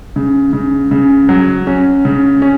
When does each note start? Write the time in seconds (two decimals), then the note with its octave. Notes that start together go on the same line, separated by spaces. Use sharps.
0.16 C#3
0.53 C#3
0.91 C#3
1.29 F#3
1.67 C#4
2.05 C#3
2.42 C#4